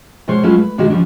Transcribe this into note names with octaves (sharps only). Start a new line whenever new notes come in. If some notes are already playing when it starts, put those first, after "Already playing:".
B2 G#3 C5 C#5
F#3 G#3 A3 C#4 E4 F4
B4
A#2 D3 D#3 G#3 F#4
F3 G3 C#4 D4